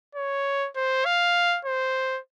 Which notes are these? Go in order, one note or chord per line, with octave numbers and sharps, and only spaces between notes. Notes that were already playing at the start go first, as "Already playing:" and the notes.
C#5
C5
F5
C5